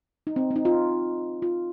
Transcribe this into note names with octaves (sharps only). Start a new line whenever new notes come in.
D#4
C4
C4
D#4
F4
F4